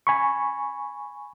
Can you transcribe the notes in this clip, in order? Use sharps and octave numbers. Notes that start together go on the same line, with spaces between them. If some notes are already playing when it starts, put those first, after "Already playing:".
G#5 B5 C#6